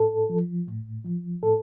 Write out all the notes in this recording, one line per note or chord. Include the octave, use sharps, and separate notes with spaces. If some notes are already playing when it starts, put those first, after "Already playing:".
Already playing: A2 A4
F3
A2
F3
A2 A4